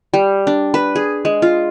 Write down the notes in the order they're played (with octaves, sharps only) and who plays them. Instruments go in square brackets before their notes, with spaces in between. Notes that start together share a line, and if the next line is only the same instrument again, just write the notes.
[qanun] G3
D4
B4
G#4
G#3
F4